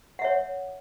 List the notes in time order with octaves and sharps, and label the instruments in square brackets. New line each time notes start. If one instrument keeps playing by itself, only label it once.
[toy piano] F#5
E5
C#5